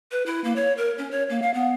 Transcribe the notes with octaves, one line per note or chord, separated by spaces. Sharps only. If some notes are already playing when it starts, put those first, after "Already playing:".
B4
E4
A#3
C#5
A#4
C#4
C#5
A#3
F5
B3